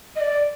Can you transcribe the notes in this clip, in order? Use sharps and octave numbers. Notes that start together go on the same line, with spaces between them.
D#5
D5